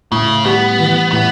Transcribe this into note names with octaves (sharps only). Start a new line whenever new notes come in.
A2 C#3
G3 B3
E3
A2 B3